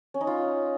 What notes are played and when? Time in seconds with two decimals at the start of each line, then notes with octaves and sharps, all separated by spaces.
0.14 C#4
0.21 D#4
0.27 F4